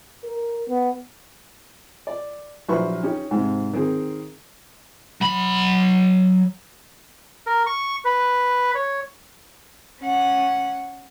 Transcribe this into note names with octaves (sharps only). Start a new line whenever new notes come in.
A#4
B3
D5
A#1 F#3 E4 B4 C5 C#6
C#4 D#4 G4
G#2 C3
D#3 C4 G#4
F#3 B5
A#4
C#6
B4
C#5
C#4 F#5